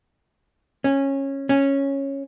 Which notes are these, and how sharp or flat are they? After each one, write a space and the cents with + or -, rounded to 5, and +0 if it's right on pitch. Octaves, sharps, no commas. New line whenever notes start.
C#4 -15
C#4 -10